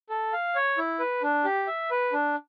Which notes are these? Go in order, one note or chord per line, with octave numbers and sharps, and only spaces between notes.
A4
F5
C#5
E4
B4
D4
G4
E5
B4
D4